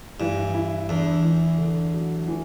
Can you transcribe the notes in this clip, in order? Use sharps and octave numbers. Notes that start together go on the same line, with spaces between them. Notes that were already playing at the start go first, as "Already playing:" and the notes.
G2 E3
E4
E2 D4
E3
D3
F#3
E3